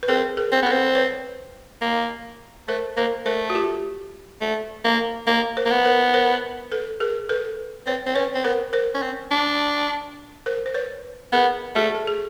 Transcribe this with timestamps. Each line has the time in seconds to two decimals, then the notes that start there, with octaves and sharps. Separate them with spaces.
0.03 B4
0.08 C4 G#4 A#4
0.37 G#4 A#4
0.52 C4
0.62 B3 A4 B4
0.72 C4
0.95 B4 C#5
1.81 A#3
2.68 A3 A#4 C5
2.96 A#3 A#4 C5
3.25 A3 A#4 C5
3.50 F#4
3.55 F4 G4
4.41 A3
4.84 A#3
5.27 A#3
5.57 A#4 C5
5.66 A#3
5.71 B3
5.85 A#4 C5
6.14 A#4 C5
6.72 A4 B4
7.00 G#4 A#4
7.29 A4 B4
7.87 C4 B4 C#5
8.06 C4
8.15 C#4 B4 C#5
8.35 C4
8.44 B3 A#4 C5
8.73 A#4 C5
8.94 C#4
9.02 C4
9.31 D4
10.46 A#4 C5
10.66 C5
10.74 B4 C#5
11.32 B3 G#4 A#4
11.75 A3 F#4 G#4
11.95 A4
12.07 G#4